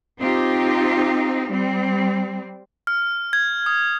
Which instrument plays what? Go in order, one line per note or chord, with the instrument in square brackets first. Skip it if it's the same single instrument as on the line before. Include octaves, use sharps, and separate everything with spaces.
[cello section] C4 D#4 F4 G4
G3 C4
[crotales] F6
G#6
D#6